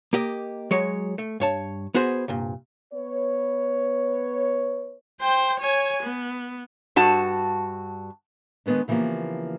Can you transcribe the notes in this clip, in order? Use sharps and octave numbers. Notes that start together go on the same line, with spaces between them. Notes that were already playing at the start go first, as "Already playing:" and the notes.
A#3 G4 D#5
F#3 G#3 C#5
A3
G2 C#5 A5
B3 F#4 G#4 C5
C2 G2 A#2
B3 B4 C#5
C5 G5
C#5 G#5
B3
G2 F#4 A5
D#3 G#3 B3 C#4 D4
C#3 E3 F3 A#3 B3 G4